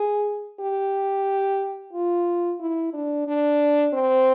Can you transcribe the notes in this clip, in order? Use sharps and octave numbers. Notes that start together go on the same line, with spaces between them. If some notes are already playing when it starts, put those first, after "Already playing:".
Already playing: G#4
G4
F4
E4
D4
D4
C4